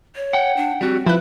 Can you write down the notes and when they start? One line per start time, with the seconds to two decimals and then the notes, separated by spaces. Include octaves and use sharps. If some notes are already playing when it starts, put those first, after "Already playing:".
0.16 C#5
0.33 F#5 G5
0.57 D4
0.81 G3 C4 F#4
1.06 F3 E4 B4 F#6